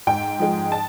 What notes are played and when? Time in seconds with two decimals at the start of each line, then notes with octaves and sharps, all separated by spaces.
0.07 G#2 G5
0.40 F3 G#3
0.72 A5